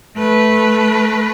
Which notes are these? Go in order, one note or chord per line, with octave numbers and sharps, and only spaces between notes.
A3 B4